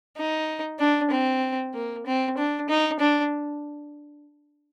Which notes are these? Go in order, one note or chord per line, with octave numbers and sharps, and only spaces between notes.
D#4
D4
C4
A#3
C4
D4
D#4
D4